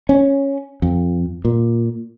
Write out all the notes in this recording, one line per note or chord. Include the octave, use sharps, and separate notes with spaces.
C#4
F2
A#2